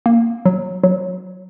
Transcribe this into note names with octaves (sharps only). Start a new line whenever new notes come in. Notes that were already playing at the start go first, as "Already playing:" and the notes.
A#3
F#3
F#3